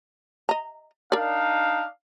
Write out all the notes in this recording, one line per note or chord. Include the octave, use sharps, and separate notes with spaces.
D#5 A#5
D4 D#4 A#4 D5 F5